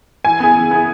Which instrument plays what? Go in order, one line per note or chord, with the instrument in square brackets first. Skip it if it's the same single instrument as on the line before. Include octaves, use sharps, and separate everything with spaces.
[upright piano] E3 [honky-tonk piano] G#5
[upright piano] B3 E4 G#4
E3
B3 E4 G#4